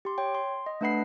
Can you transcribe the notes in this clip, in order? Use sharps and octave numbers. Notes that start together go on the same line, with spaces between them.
G4 C6
C#5 G5
C6
D#5
A3 D4 B4 F#5 B5 C7